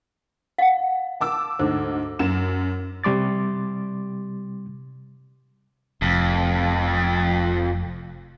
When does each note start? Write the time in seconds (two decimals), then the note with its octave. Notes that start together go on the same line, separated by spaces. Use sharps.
0.58 F5 F#5
1.21 A5 D6 E6
1.59 D2 G#2 C5
2.19 F#2 E7
3.04 C3 G3 C6 D6 A6
6.02 F1 F2